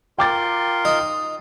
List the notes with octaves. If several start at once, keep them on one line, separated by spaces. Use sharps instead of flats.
F4 A#4 G5 C6 D6 A6
D#4